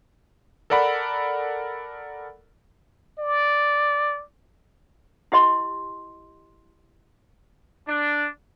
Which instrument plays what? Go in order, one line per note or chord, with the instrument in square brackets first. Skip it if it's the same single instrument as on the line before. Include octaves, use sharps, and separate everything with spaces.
[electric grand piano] A4 A#4 D5 F#5 B5
[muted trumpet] D5
[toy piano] E4 G4 D#5 C6
[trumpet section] D4